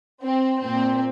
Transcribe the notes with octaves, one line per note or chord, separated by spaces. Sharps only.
C4
A#2 C4